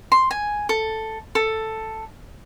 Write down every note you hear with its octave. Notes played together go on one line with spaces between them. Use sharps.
C6
G#5
A4
A4